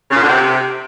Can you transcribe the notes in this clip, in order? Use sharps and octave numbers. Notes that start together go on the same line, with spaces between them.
C#3
A#2
D3
C3